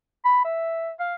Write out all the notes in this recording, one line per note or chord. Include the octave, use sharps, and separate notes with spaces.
B5
E5
F5